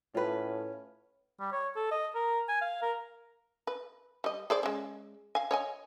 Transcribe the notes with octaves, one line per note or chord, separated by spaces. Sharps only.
A2 C#4 F4 B4
G3
C#5
A4
D#5
A#4
G#5
F5
A#4
B4
G3 D#5
G#4 C5 D5
G#3 C#4
F5 G#5
C#5 D#5 G#5